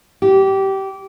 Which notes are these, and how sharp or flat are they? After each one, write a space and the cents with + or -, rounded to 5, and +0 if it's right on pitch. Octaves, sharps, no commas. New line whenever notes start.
G4 -20